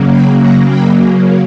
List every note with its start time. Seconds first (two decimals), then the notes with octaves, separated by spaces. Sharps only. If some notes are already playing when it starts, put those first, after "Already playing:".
Already playing: C#3 F#3 A#3
0.11 G5 B5
0.40 F#5 A#5
0.68 G5 B5